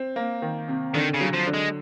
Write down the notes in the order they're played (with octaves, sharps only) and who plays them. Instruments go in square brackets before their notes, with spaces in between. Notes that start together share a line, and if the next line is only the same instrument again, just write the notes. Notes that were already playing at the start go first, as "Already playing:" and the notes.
Already playing: [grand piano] C4
A#3
D#3
C3
[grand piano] D3 [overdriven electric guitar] D#3
[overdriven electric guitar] C#3
[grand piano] F#3
[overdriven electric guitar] F3
[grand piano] D3
[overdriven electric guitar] G#3